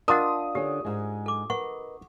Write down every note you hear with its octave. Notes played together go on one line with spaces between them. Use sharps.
D4 F4 A#4 D#5 F#5 D#6
D3 C#4 G4
G#2 G#3
A4 D6
A#4 B4 D#5 F#5 C#6